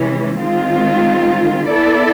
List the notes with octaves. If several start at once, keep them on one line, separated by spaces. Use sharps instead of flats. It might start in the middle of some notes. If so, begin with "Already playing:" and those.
Already playing: C3 E3 G#3 C#4
D#3 G#3 C4 F4
B3 E4 A4 D5